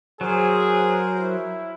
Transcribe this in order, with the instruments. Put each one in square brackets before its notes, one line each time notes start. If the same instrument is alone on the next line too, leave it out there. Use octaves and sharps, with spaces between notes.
[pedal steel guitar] F#3 [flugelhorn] G#4 [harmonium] A#4 C5
[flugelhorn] E4